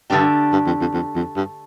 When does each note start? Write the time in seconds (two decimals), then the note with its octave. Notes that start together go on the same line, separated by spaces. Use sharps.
0.10 G2 D3 A3 D4 G4
0.52 G2
0.67 F2
0.81 F2
0.94 F2
1.15 F2
1.36 G2